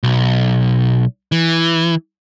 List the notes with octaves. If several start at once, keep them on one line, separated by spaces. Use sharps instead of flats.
B1
E3